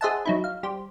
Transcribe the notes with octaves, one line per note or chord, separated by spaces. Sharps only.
G#4 C5 D#5 E5 F#5 A5
F#3 D#4 E4
F5
G3 G4 C5